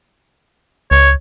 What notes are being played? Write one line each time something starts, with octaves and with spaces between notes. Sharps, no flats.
C#2 C#5